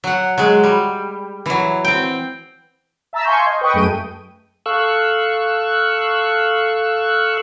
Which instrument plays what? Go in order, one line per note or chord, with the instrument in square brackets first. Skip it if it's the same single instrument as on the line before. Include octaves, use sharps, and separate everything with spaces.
[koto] F#3 F#5
F#3 G#3
G3
E3 F#3
C4 G5
[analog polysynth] E5 A5 A#5 E6 B6
F5 G#5 C6 C#6 G6
D#5
B4 D#5 G5 C#6 D#6
F#2 A3 G#4 G5 G6 D#7
[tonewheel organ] A4 F5 C#6 E6 F#6